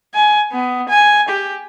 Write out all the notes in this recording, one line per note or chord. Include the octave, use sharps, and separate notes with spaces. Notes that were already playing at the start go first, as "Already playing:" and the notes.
G#5
B3
G#5
G4